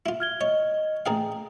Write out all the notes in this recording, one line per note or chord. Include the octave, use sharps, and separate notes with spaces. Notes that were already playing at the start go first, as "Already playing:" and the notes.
E4 F4
F6 G#6 G7
C#5 D#5
A1 G#4 F5 G5 A#5